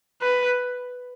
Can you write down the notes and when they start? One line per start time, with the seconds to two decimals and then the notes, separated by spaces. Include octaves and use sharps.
0.22 B4